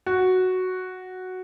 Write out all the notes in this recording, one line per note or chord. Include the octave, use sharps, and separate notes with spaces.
F#4